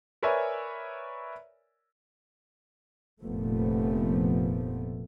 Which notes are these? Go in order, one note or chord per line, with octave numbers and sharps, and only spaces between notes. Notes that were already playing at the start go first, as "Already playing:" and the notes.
A#4 B4 C#5 D5 E5 G#5
F1 A#2 F3 A3 B3